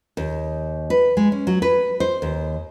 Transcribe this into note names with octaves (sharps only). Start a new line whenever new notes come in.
D#2
B4
G#3
C#4
F#3
B4
C5
D#2